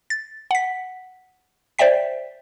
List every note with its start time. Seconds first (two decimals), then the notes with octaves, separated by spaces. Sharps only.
0.10 A6
0.51 F#5 B6
1.79 C5 D5 E5 G5 B6